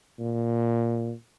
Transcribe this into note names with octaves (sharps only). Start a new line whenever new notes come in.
A#2